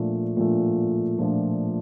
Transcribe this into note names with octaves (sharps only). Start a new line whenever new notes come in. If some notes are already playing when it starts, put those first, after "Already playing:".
Already playing: A#2 F3 A3 D4
A#2 F3 A3 D4
A#2 F3 A3 D4